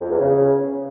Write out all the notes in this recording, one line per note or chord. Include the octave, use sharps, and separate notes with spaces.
F2
E2
C#3